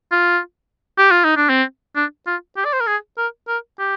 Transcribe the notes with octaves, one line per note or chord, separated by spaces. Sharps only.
F4
G4
F4
D#4
D4
C4
D4
F4
G4
D5
C5
A#4
G#4
A#4
A#4
G4